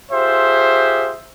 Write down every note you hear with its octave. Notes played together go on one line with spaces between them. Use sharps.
F4 G4 G#4 C5 E5